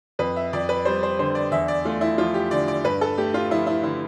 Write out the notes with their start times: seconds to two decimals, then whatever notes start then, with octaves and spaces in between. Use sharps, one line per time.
0.19 F2 B4
0.36 E5
0.53 F2 D5
0.69 B4
0.85 G3 C5
1.03 C5
1.19 D3 C5
1.35 D5
1.51 E2 E5
1.68 D5
1.85 A3 F4
2.01 E4
2.18 F3 F4
2.34 G4
2.51 D3 D5
2.68 D5
2.84 G2 B4
3.01 A4
3.18 A3 G4
3.34 F4
3.50 F3 E4
3.67 E4
3.83 D3 E4